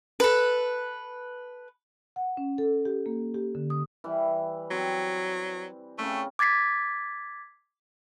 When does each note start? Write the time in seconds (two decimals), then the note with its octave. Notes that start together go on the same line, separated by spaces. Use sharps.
0.20 A4 B4
2.16 F#5
2.37 C#4
2.58 A4
2.85 G4
3.06 A#3
3.34 G4
3.55 D3
3.70 D#6
4.04 E3 G3
4.71 F#3 C4
5.98 C#3 A3 C4 C#4
6.39 D6 G#6 A6 B6 C7